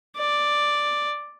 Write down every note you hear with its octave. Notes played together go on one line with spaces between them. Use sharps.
D5